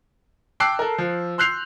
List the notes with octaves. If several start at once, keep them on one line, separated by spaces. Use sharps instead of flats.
G5 A5 D6 E6 F#6 C7
A4 A#4
F3
C6 E6 F#6 G6 C7 F7